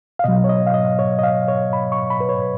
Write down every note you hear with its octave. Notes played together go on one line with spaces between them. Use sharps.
F5
B2 F#3 D#5
C#5
D#5
F5
D#5
C#5
D#5
F5
C#5
B5
C#6
B5
B4
C#5